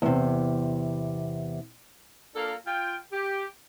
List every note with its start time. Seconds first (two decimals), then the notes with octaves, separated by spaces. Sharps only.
0.02 E2 C3
2.35 A#3 D4 F4 A4 A#4 F5
2.66 F4 G5
3.13 G4